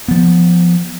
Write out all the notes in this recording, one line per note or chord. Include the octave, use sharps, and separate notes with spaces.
F3 B3